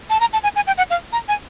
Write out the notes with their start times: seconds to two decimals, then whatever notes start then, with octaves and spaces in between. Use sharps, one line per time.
0.10 A5
0.20 A#5
0.33 A5
0.43 G#5
0.56 G#5
0.67 G5
0.78 F#5
0.90 F5
1.13 A#5
1.28 G#5